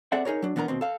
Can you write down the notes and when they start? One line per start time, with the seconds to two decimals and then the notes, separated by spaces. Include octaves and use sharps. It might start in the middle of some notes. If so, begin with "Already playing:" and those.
0.12 C4 G#4 A4 D5 E5 F#5
0.25 D#4 G#4 A#4 C#5
0.42 F#3 D4
0.56 E3 B3 D4 A#4 A#5
0.68 D#2 B2 C4
0.81 A4 F5